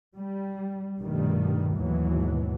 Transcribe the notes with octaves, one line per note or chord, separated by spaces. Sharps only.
G3
A#1 G2 B2 D#3 G3 A3
D#2 G#2 B2 E3 F#3